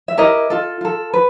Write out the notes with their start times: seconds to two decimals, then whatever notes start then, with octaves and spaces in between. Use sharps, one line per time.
0.08 E5
0.17 E4 G4 A#4 D#5
0.50 F4 A4
0.81 F4 A4
1.13 B4